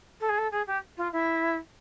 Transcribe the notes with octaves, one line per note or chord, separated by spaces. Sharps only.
A4
G#4
A4
G#4
G4
F4
E4